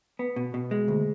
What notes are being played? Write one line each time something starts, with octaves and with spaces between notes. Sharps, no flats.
B3
B2
B2
G#3
D2